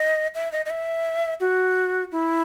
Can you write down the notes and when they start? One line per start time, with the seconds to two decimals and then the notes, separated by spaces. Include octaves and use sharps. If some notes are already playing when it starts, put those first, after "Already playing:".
Already playing: D#5
0.35 E5
0.52 D#5
0.66 D#5
0.70 E5
1.40 F#4
2.12 E4